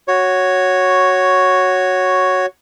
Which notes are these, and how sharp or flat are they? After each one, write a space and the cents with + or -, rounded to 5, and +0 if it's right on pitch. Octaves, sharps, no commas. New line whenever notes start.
F#4 +0 C#5 +0